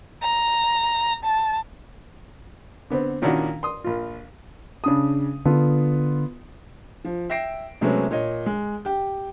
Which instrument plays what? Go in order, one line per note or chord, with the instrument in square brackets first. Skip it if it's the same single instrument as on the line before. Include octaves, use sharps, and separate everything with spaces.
[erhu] A#5
A5
[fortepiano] D3 B3 C4
A#2 D#3 C#4 D4 E4 F#4
C6 D#6
A#1 F4
[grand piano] C#3 D4 D#6
[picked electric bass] D3 [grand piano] B3 F4
[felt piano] F3
E5 G5 A#6 C7 D7
C3 F#3 G#3 A3 B3 C#4
A#2 C#5 D#5
G#3
G4 G5